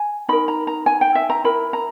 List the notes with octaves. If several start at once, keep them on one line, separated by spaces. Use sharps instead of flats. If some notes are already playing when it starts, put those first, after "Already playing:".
Already playing: G#5
D#4 A#4 B5
A#5
A#5
G#5
G5
E5
A#5
E4 A#4 B5
A#5